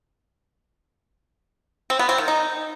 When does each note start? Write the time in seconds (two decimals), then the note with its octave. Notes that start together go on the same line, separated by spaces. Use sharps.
1.90 C4
1.99 B3
2.09 C4
2.18 D#3
2.28 D#4